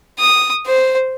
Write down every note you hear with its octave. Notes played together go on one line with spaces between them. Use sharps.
D#6
C5